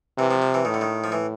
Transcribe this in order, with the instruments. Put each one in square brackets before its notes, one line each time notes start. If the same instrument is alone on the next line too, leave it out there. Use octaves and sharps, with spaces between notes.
[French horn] C3 [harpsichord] E3
[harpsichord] F3
F3
E3
[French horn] A2 [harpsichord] D#3
[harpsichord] D3
D#3
F3
E3